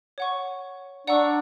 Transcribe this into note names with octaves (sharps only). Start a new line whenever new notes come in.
C#5 F#5 C#6
D4 D5 F#5 A#5 C#6 E6